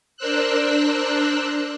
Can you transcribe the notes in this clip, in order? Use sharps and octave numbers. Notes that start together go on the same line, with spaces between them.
D4 A#4 C5 E6 F#6